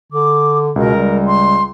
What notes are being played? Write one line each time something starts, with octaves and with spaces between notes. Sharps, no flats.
D3 D6
C#2 B2 A#4
G3
C6